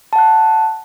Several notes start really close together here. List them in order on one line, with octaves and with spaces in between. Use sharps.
A5 F#5 F#6